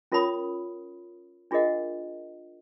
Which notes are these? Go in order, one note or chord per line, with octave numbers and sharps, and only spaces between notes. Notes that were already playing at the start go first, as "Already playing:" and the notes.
C#4 F4 A#4 C#5 B5 D#6
D4 F4 G#4 A#4 D#5 F#5